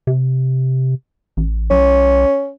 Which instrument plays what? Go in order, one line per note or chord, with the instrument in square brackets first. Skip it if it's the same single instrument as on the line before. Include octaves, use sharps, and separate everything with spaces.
[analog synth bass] C3
A1
[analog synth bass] B1 [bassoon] C#4